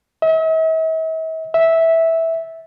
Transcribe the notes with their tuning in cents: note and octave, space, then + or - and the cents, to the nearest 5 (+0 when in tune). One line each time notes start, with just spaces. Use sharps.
E5 -45
E5 -10